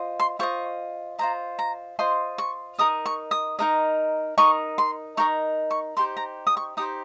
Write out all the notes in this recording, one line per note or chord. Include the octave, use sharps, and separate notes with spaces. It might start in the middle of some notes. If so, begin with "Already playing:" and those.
Already playing: F4 C5 D#5
C6
F4 C5 D#5 C#6
F4 C5 D#5 A#5
A#5
F4 C5 D#5 C6
C#6
D#4 A#4 D#5 D#6
C#6
D#6
D#4 A#4 D#5
D#4 A#4 D#5 C#6
C6
D#4 A#4 D#5 C#6
C#6
D#4 G4 C5 C6
A#5
D#6
C#6
D#4 G4 C5 D#6